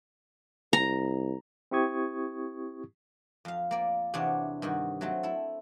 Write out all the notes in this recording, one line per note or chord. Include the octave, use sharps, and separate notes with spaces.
C2 A#5
C4 E4 G4 C#6 D#6 G#6
F2 F5
A#3 D5
E2 C3 B3 D4 C#5
G2 D#3 F#4
F#3 A3 C4
E4 A4